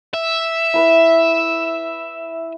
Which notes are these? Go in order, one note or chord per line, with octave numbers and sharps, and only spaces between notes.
E5
E4 B4 D#6